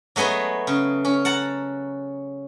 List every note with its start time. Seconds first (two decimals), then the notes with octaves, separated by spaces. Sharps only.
0.16 F#3 A3 B3 G#4 D#5
0.67 C#3
1.05 C#4
1.25 F#5 A5 A#5